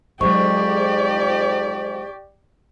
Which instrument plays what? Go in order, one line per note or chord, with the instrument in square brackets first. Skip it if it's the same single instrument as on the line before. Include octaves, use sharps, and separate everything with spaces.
[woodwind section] F2 G#2 [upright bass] F#3 G#3 [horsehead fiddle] G4 D5 [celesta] C#6